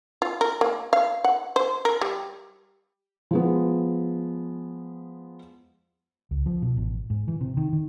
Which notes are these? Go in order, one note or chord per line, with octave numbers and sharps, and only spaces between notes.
F4
A#4
A#3
F5
F#5
C5
A#4
G3
F3 G#3 B3
C#2
F3
B2
A1
G#2
E3
C3
D#3
D#3